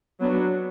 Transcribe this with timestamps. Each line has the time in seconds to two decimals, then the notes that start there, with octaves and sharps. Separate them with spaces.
0.19 F#3 B3 D4